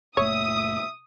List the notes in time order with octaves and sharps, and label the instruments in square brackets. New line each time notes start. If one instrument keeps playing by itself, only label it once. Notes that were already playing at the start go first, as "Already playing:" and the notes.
[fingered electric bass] F#1 A#2 A3 [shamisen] C#5 [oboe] E5 [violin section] D#6